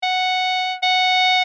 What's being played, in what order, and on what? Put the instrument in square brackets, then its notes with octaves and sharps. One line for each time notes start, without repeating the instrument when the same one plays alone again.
[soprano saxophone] F#5
F#5